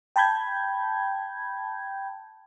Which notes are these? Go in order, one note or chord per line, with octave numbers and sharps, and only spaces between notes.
G5 A5 B5 G6 G#6